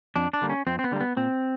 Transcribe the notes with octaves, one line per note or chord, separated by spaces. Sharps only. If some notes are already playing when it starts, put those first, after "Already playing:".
F2 D4
D4
D3 G3 A#3
C#4
F2 C4
C4
B3
D3 G3 A#3
B3
A#2 C4